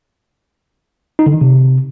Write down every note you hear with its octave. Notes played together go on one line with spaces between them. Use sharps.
D#4
D3
D#3
C3